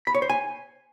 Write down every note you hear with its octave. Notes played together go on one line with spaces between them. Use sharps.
B5
C#5
C5
G#5